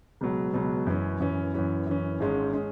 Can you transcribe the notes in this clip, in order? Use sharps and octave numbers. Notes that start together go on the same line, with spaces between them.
C#2 B2 F#3
C#2 B2 F#3
F#2 E3 C#4
F#2 E3 C#4
F#2 E3 C#4
F#2 E3 C#4
G#1 G#2 G#3 C#4
G#3 C#4